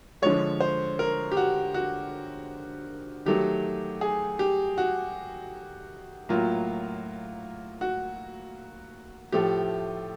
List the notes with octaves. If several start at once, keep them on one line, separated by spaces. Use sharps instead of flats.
D3 F3 G#3 C#5
C5
A#4
G4
F#4
F#4
D#3 F#3 A3 G4
G#4
G4
F#4
A2 F#3 A#3 F4
F#4
A2 F3 A3 G4